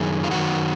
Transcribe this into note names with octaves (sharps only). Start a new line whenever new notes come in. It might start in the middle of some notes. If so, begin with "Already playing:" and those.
Already playing: F#2 D#3 G#4
F4
F#2 D#3 F#4